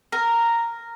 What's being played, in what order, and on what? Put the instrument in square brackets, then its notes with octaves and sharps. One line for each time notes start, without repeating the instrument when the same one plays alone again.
[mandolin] A#4